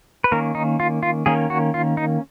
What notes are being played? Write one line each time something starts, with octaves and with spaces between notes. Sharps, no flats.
B4
D#3 A#3 C#4 A#4
D#4
F4
F4
D#3 A#3 C#4 G#4
F#4
F4
D#4